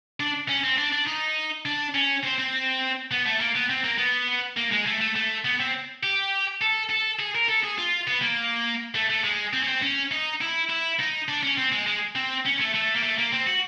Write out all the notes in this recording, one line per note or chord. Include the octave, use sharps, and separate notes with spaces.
D4
C#4
C4
D4
D4
D#4
D4
C#4
C4
C4
B3
A3
A#3
B3
C4
A#3
B3
A#3
G#3
A3
A3
A3
B3
C4
G4
A4
A4
G#4
A#4
A4
G#4
F4
B3
A#3
A3
A3
G#3
C4
C#4
C4
C#4
D#4
E4
E4
D#4
D4
C#4
C4
G#3
G#3
C4
C#4
A3
A3
A#3
A3
A#3
C4
F#4